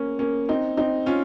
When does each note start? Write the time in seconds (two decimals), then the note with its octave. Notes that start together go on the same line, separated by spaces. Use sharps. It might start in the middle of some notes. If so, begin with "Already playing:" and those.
Already playing: A#3 C#4
0.19 A#3 C#4
0.49 C4 D#4
0.77 C4 D#4
1.06 C#4 F4